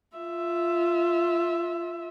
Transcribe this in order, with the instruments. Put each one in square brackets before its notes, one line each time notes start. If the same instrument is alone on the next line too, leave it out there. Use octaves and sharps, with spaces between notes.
[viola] F4 E5